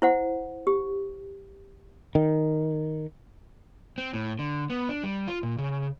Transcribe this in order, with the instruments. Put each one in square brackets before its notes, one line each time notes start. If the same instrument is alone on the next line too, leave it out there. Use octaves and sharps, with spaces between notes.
[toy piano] E4 C5 F#5
G4
[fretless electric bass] D#3
[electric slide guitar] C4
A2
D3
B3
D4
G3
F4
A#2
C#3